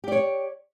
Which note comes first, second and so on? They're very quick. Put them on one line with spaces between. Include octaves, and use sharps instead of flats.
G4 D5 C#5